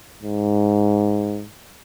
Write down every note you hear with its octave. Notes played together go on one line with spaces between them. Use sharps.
G#2